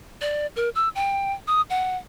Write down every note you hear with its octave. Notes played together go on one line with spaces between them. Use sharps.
D5
A#4
E6
G5
D#6
F#5